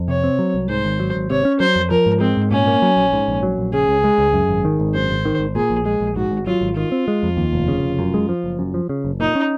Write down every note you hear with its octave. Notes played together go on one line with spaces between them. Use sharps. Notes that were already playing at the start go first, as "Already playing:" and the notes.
Already playing: F2
C3 C#5
C4
F#3
C2
G#2 C5
G#1
F#3
G#1
C3 C#5
C#4
F#3 C5
F2
F3 A#4
G#2
G#3 C4
G#2
A#2 C#4
A#3
F#3
A#1
G#2
A#1
F#3
A#1
C#3 G#4
C#2
G#3
C#2
F#2
G#1
D#3
G#1
F#2 C5
G#1
D#3
G#1
A#2 G#4
A#1
G#3 G#4
A#1
G#2 F#4
G#1
F#3 F4
G#1
D#3 F4
C4
G#3
F2
D#2
F1
C#3
F1
F#2
G#3
F3
F#1
F#2
F3
C#3
F#1
A#2 D#4
C#4